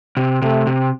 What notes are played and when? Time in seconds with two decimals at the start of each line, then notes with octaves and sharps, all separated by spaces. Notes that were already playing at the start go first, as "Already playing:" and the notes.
0.17 C3
0.42 C3 A3
0.67 C3